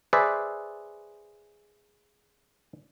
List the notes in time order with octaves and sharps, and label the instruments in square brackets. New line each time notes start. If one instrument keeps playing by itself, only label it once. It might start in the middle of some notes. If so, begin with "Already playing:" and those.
[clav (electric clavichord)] G#4 B4 C5 D5 E5